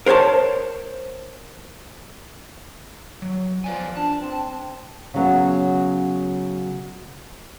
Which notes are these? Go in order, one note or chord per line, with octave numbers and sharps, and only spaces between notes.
A#4 C5 C#5 G#5 A5
F#3
F3 B4 D5 G#5
D4 A5
C4
C#3 F#3 B3